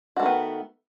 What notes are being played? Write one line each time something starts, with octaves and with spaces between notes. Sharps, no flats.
D#3 A3 B3 F#4